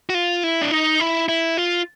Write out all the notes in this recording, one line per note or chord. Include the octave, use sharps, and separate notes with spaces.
F#4
F4
E4
D4
D#4
E4
E4
F4